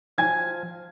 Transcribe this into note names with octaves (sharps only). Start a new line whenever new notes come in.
F3 G#5 G#6